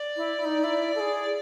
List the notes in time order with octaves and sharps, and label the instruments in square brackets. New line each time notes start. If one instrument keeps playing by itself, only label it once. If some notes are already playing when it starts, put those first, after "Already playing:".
Already playing: [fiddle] D5
[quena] E4
E4
D#4
E4
A4
G#4